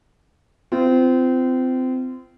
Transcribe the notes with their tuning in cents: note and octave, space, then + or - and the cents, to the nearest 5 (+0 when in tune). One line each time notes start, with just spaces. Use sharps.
C4 -25 F4 -30